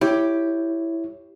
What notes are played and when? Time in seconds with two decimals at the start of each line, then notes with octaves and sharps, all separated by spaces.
0.01 E4 G4 C#5